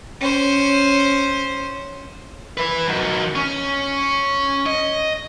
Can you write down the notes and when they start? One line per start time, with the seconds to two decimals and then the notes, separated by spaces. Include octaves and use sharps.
0.21 C#4 C5
2.57 B4 E5
2.88 D#3 F#3
3.36 C#4
4.66 D#5